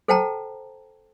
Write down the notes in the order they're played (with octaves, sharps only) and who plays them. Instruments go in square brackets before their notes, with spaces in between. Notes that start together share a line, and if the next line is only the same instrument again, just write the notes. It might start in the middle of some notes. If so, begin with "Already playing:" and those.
[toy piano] A4 C5 F#5 G5 A5 A#5